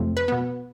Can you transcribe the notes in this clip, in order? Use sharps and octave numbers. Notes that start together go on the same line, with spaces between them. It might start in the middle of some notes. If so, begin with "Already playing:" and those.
Already playing: F2 C3 F3 A3 C4
B4
B2 B3